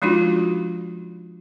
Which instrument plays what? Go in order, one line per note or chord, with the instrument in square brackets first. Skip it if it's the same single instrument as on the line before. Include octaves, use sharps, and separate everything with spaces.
[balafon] F3 G#3 D4 D#4 F4 F#4